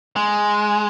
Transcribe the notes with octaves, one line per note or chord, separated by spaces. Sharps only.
G#3